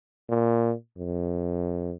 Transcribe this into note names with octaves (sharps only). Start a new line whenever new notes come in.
A#2
F2